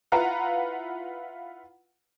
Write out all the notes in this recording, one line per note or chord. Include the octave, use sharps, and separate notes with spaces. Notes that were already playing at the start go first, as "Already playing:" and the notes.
E4 F4 B4 F5 F#5 A#5